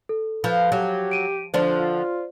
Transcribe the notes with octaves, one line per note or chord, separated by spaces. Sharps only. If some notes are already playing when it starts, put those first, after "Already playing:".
A4
F3 B4
F#3 G4
D7 D#7
D3 F3 D4 C5 D5
F4